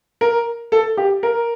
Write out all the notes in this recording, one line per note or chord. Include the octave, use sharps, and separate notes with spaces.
A#4
A4
G4
A#4